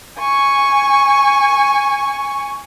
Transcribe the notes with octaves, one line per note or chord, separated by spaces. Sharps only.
G#5 C#6